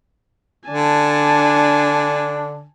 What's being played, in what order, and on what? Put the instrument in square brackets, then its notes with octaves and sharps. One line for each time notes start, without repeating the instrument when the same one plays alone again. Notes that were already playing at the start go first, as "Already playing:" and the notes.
[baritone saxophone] D3 [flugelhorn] D4 [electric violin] G#5 A5